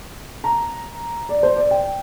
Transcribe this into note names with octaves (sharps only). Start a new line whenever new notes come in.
A#5
D5
C5
D5
G5